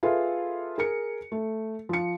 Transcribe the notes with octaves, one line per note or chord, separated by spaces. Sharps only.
F4 G#4 A4 B4 E5 F5
G#4 A#4 C#7
A3
F3 C#7